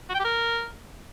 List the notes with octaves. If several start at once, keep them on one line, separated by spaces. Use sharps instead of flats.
F#4
G5
G4
A#4